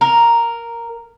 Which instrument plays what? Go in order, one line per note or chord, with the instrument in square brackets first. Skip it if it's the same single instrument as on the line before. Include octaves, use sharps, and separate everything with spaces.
[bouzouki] A#4